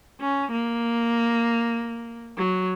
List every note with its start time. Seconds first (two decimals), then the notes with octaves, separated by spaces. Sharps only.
0.21 C#4
0.52 A#3
2.38 F#3